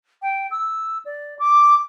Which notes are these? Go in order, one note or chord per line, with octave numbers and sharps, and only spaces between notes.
G5
E6
D5
D6